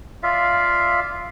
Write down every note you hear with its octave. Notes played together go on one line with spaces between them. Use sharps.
F4 D5 E5 F5